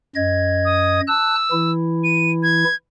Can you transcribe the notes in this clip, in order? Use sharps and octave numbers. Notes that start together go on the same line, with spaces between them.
F#2 D#5 G#6
D#6
A5 E6 F#6
E3 E4
D#7
G#6